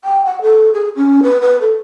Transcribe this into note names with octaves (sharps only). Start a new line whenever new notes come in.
G5
F#5
A4
G#4
C#4
B4
B4
A4